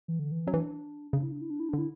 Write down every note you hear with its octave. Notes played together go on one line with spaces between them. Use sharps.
E3
D3
E3
F#3 C#4
E3 D4
C#3 D4
E4
D4
E4
D4
E4
D4
D3
E4